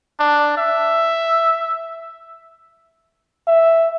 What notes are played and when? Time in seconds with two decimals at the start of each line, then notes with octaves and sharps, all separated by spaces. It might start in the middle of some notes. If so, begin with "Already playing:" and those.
0.19 D4
0.58 E5
3.47 E5